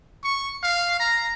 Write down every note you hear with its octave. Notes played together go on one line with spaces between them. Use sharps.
C#6
F5
A#5